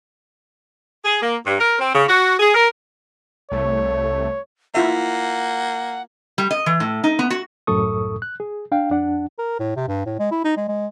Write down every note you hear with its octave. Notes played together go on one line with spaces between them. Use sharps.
G#4
A#3
G2
A#4
C4
C#3
F#4
G#4
A#4
C2 A3 C#5
A#3 E4 F4 E5 F#5
G3
D#5
E3
A2
D#4
B3
F#4
C2 F#2 A2 A4 C#6 D#6
F#6
G#4
D4 F5 G5
F2 D4 F#5
A#4
A2
C3
G2
A2
G#3
E4
D#4
G#3
G#3